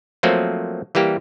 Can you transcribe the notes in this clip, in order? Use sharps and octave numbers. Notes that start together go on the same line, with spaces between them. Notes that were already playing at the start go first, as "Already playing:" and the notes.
F3 F#3 A3 A#3 C4
E3 G3 A#3 G4